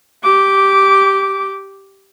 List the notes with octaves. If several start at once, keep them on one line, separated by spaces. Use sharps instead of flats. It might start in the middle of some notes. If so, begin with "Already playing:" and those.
G4 D6